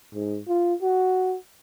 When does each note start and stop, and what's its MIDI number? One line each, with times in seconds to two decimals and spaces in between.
0.14 0.39 44
0.48 0.74 65
0.82 1.36 66